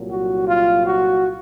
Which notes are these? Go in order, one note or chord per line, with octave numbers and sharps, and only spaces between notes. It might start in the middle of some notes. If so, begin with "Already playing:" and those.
Already playing: C2 A#2 F#3
F#4
F4
F#4